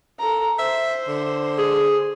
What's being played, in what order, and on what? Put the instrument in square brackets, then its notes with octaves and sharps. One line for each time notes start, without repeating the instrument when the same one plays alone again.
[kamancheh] A4 A#5
[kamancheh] C5 [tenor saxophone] E5
[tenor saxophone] D3
[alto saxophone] G#4